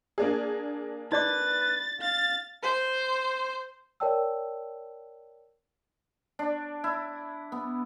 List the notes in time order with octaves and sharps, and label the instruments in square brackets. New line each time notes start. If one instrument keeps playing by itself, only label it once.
[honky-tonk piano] A#3 D4 G#4
[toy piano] D#4 D5 D6 [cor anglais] B4 [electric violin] A6
[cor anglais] F5 [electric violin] A6
[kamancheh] C5
[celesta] A#4 C#5 D5 G5 A5 E6
[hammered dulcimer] D4
E4
B3